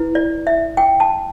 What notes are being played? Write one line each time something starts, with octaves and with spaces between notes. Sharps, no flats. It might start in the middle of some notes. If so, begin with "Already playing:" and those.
Already playing: E4 B4
D5
E5
G5
A5